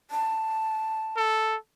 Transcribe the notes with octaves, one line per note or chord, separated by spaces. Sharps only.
A5
A4